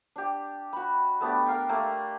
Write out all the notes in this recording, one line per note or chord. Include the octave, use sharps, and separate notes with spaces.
D4 G4
F#4 B5
A3 B3 D4 G4
A#4 F5 G5
A3 A#3 G4